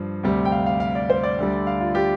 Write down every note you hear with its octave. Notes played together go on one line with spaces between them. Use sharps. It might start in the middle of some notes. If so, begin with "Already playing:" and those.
Already playing: G2 F3
D2 C3 G3
G5
F5
F5
F5
D5
C5
D5
D2 D3 G3
F5
F4
G4